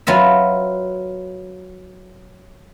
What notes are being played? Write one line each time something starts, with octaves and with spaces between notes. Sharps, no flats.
F#3 F4 B4 E5